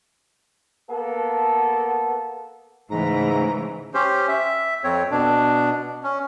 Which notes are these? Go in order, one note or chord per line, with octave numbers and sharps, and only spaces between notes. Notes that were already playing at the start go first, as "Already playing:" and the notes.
A#3 B3 A4
G#2 C#3 E3 A3 A#5
C#4 G4 C5
E5
F2 C4 C#5
B2 D4
C#4